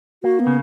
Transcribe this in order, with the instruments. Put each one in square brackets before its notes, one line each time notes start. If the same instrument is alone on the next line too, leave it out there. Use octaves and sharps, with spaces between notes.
[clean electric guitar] A#3 [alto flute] F#4
[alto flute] B3
[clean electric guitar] C#3